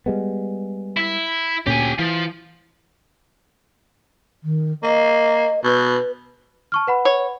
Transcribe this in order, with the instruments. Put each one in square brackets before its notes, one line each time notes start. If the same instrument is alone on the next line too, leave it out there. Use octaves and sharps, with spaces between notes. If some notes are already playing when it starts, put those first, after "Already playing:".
[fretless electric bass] G3 G#3 B3
[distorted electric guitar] E4
[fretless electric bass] D2 A#2 C#4 [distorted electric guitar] G4 G#5
[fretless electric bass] E3 [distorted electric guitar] F3
[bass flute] D#3
[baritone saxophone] A#3 [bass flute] D#5
[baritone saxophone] B2 [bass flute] B4
[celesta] A5 C#6 F6
B4 F#5 B5
[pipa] C#5